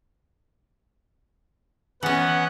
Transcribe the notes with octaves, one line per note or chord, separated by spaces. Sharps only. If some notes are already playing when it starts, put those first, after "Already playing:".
E3 B3 C#4 F#5